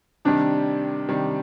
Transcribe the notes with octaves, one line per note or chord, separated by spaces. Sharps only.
C3 D#3 G3 D4
C3 D#3 G3